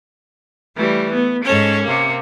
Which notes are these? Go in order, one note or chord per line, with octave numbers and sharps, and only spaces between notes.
E3 G3 A3
B3
G#2 C#4 A4 C#5
C3 A#3